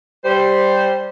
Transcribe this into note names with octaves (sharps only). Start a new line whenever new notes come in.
G3 C5